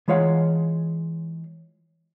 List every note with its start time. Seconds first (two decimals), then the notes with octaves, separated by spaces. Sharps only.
0.08 E3 G#3 F4 C#5 F5 F#5